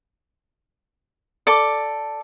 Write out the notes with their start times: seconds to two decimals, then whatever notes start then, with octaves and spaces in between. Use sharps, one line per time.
1.47 A4 D5 D6